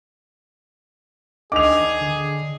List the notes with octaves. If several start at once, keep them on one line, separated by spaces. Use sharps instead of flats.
D#3 D4 G#4 D6 F7
D3